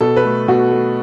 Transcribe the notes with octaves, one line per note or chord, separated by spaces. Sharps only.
B2 A4
B4
A3
B2 F#4
A3